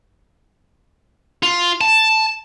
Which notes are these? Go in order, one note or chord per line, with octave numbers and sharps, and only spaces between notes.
F4
A5